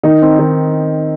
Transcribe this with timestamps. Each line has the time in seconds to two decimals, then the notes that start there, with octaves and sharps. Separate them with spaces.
0.03 D#3 D#4
0.22 C4
0.39 D#3